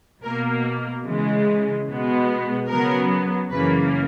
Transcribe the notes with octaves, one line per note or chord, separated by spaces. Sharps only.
B2 A#3 A#4
C#3 E3 G#3
B2 G#3 B3
C#3 F#3 B3 A#4
F#2 C#3 E3 A#3 B4